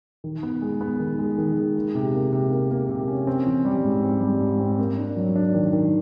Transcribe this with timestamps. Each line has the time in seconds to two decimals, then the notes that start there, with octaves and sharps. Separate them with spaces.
0.24 D#3
0.43 B3
0.62 G#3
0.81 B3
1.00 D#3
1.19 G#3
1.38 D#3
1.57 G#3
1.75 A#3
1.95 C3
2.14 A#3
2.32 C3
2.51 A#3
2.70 A#3
2.89 C3
3.08 C#4
3.27 C4
3.46 E3
3.65 G3
3.84 G#2
4.03 C4
4.21 G3
4.41 G#2
4.60 C4
4.79 A#3
4.97 D4
5.16 F#3
5.36 D4
5.54 D#3
5.73 D#3